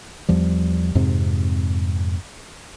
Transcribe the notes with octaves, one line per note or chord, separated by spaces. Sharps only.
E2 F3 G3
F2 G#2 C3